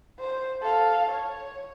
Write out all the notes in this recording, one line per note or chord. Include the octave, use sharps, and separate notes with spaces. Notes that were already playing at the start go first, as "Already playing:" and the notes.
C5
A4 F5
C#5